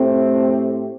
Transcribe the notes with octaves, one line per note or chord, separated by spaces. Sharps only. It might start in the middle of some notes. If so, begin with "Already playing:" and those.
Already playing: A2 A3 C4 G4